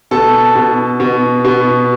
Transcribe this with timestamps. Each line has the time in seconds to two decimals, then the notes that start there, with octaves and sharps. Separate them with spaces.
0.11 B2 A4 A5
0.55 B2
1.00 B2
1.44 B2